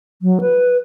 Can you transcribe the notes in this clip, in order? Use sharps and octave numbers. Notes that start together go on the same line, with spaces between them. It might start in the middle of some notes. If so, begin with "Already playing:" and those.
F#3
B4